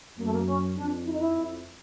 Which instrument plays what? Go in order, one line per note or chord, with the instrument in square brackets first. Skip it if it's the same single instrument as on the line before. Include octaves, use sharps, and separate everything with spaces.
[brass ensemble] F#2 [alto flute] A#3
[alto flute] A3
A#3
C#4
[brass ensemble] F2 [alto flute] D4
[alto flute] E4
D#4
E4
[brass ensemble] F2